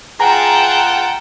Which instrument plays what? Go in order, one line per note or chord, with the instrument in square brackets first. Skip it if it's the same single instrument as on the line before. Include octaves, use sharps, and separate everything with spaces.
[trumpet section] F4 F#5 [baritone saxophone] G#4 [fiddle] G5 A5 [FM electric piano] A#5